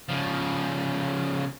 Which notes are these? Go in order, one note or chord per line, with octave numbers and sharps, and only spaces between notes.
C#3 F3